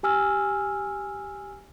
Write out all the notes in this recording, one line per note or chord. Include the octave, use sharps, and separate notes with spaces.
G4 G#5 E6 F6